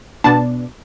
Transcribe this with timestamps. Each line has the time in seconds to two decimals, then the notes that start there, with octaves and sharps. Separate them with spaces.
0.24 B2 B3 D4 A5